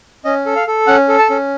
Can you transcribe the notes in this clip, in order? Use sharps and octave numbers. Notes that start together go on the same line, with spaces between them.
C#4 D#5
A4
F5
A4
C#4 F#5
A4
A5
C#4